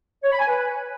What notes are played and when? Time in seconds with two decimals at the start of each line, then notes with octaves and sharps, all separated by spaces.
0.24 C#5
0.31 B5
0.39 G#5
0.47 B4